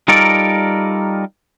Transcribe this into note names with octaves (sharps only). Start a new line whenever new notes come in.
G3 D#4 F4 A4 A#4 D5